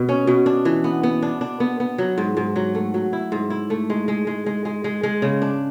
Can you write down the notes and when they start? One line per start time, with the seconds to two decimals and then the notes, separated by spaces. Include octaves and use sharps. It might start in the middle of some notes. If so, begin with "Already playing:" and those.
Already playing: B2
0.09 C#4
0.27 B2
0.46 D4
0.65 E3
0.84 B3
1.03 B3
1.22 D4
1.41 D4
1.60 B3
1.80 B3
1.98 F#3
2.18 G#2
2.37 G#2
2.56 F#3
2.75 A3
2.94 F#3
3.13 E4
3.32 G#2
3.50 E4
3.70 A3
3.90 G#3
4.08 G#3
4.27 G#3
4.46 G#3
4.65 G#3
4.84 G#3
5.03 G#3
5.22 C#3
5.42 D4